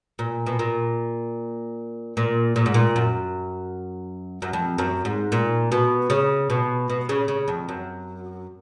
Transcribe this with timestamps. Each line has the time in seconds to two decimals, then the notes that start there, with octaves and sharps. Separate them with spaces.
0.19 A#2
0.46 B2
0.59 A#2
2.17 A#2
2.56 A#2
2.66 G#2
2.74 A#2
2.96 F#2
4.42 F#2
4.53 F2
4.78 F#2
5.05 G#2
5.32 A#2
5.72 B2
6.10 C#3
6.50 B2
6.90 B2
7.09 C#3
7.28 C#3
7.48 F2
7.69 F#2